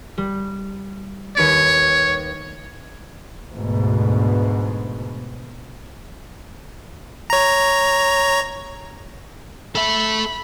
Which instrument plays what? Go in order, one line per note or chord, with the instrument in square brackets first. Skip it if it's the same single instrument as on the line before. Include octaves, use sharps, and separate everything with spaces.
[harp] G3
[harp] D#2 B4 C#7 [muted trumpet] C#5
[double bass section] D2 G#2 B2
[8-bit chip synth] C#5 A#5
[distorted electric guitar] A4 E5 [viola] B5